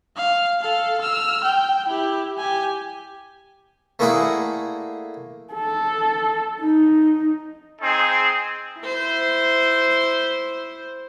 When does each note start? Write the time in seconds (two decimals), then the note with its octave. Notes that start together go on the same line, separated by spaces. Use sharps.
0.16 F5
0.61 A4 F5
1.01 E6 F6
1.44 G5
1.88 E4 G4
2.38 G4 G#5
3.99 A3 A#3 E4 G#4 D5 F#5
5.53 A4
6.62 D#4
7.81 C4 D#4 G#4
8.81 E4 C5